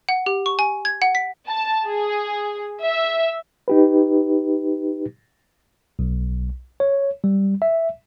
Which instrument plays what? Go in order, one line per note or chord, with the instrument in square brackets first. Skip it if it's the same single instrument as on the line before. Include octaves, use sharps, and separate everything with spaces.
[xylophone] F#5
G4
C#6
G#5
G#6
F#5
B6
[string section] A5
G#4
E5
[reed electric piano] D#4 G4 B4
[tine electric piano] B1
C#5
G3
E5